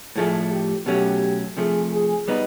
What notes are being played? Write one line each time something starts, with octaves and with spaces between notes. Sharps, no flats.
A2 F3 A3 G#4
G4
B2 F#3 A3 C#4 G4
C3 F3 A3 G#4
G#4
G3 B3 D#4